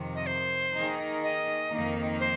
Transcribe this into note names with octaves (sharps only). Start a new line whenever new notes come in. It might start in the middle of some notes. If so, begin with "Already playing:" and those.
Already playing: F2 C3 D#3
D#5
C5
D#3 A#3 D#4 G#4
D#5
F2 D#3 A#3 D#4
C5